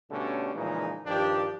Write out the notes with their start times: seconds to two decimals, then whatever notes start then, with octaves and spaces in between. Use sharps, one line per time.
0.11 B2 D3 G3 A3 C#4
0.55 A#2 C#3 E3 F3 G#3 D#4
1.06 G2 D#3 F3 D4 G4